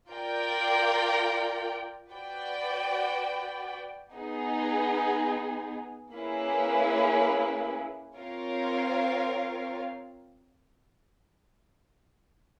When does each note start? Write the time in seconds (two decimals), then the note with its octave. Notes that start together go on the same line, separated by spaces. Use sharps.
0.11 F4 A#4 D5 G5
2.12 F#4 B4 D5 G5
4.13 B3 D#4 G#4
6.14 A#3 C#4 E4 G#4 B4
8.16 C4 F4 A#4 C#5 F5